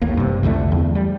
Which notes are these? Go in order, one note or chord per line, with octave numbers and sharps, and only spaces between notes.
A1 D#2 A2 A#3
G2 C3
C2 F2 D3 A3
E2
G3